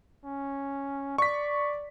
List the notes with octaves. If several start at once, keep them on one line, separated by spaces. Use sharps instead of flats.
C#4
D5 C#6 B6